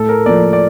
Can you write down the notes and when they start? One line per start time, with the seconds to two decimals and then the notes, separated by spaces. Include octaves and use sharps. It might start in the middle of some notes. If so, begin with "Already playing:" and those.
Already playing: A2 A4
0.09 A#4
0.26 F3 A#3 D5
0.53 D5